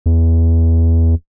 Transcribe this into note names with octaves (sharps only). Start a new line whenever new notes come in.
E2